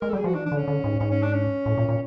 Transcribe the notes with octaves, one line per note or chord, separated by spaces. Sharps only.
G#3 A#4
A4
G3 G4
G#4
F3 F#4
E3 D4
D4
D3
C#4
D3
G#2
G#2 C#4
C#4
D4
C#4
A2
A#2
A#2